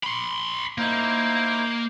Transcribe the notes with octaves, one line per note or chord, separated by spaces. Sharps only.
B5 C6
A#3 D#4 E4 C5